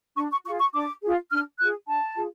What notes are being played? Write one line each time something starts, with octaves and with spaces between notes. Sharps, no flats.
D4 C#6
C#6
F4 G#4 C#6
C#6
D4 D6
F4 G#4
D4 F6
F4 G#4 F#6
D4 A5
F4 G#4